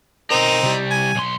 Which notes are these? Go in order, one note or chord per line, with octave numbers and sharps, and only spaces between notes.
B2 C4 D#4 A#4
C3 G3
G#5
B1 C6